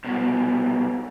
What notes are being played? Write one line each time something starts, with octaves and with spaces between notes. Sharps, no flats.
C2 B2